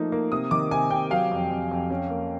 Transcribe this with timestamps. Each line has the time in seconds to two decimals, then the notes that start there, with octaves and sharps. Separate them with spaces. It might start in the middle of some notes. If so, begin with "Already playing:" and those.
Already playing: F3 A3 A#3 D#4
0.12 A#3
0.32 C3 D#6
0.51 D#3 D6
0.71 C3 G#5
0.91 C3 G5
1.10 F#3 F5
1.31 F2
1.50 F2
1.71 F2
1.91 C#4
2.10 A#3